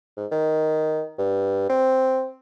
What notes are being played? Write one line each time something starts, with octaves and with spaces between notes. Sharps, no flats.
G#2
D#3
G2
C4